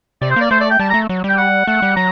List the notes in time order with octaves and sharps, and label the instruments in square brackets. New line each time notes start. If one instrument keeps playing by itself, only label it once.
[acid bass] C3 [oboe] D5
[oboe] C5
[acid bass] A#3 [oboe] D5
[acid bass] A3 [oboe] C5
[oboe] D5
G5
[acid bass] G3 [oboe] A5
[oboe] A#5
[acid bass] A3
F#3
[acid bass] G3 [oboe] G5
[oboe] F#5
[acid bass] A3 [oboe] F#5
[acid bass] G3
[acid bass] F#3 [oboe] A#5